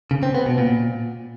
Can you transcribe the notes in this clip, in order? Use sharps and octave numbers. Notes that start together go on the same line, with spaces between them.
C#3
C4
B3
B2
A#2